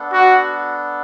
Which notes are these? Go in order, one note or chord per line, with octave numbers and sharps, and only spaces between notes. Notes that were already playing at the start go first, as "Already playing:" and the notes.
Already playing: B3 D4 A4 F#5
F#4